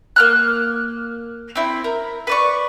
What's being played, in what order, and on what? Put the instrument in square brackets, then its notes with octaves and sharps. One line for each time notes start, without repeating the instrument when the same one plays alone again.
[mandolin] A#3 F6 F#6
C4 E4
A#4
B4 D5 C#6